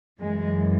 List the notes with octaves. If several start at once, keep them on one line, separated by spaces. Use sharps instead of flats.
F#2 E3 G#3